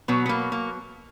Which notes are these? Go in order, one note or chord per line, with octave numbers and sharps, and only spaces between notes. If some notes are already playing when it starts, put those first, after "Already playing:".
B2 F#3 B3
B3
A#3
A#3